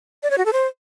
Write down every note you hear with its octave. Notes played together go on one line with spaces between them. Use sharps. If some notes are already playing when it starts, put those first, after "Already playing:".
D5
C#5
F#4
A4
C5